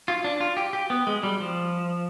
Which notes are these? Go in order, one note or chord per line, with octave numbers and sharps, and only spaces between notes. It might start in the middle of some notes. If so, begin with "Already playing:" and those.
F4
D4
F4
G4
G4
B3
G#3
G3
F3